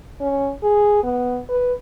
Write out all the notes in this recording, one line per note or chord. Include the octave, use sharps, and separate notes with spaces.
C#4
G#4
B3
B4